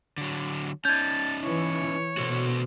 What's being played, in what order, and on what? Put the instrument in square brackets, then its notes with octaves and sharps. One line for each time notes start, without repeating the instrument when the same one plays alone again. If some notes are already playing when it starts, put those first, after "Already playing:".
[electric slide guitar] D3 F#3
[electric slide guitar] C#4 D#4 [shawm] A5 [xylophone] G6 G#6
[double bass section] E3 [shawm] C#5
[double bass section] B2 [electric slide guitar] F#4 A4 C5